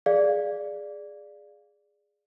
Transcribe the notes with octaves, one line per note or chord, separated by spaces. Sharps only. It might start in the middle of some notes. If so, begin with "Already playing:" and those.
G#4 D5 F5